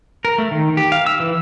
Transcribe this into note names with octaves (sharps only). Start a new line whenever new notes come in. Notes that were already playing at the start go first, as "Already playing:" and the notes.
A#4
A3
D#3
G4
F5
E6
E3